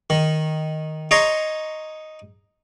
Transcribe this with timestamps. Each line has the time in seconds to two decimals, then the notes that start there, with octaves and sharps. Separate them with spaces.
0.10 D#3
1.11 D#4 C#5 A#5 C6